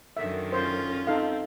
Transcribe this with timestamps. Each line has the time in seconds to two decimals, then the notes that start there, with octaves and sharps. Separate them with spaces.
0.17 F#2 D3 D#3 E5
0.52 C#4 F4 C5
1.07 C4 D#4 A4 F5